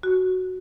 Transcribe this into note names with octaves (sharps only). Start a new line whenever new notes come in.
F#4